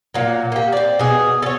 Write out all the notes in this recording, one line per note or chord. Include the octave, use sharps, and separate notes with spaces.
A#2 F#3
A#3 G4
C4 D5
B2 G#4
A4 C#5